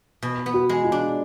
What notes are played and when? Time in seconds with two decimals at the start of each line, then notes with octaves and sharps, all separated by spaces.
0.22 B2
0.46 B3
0.54 F#4
0.69 G#3
0.84 F4
0.92 D4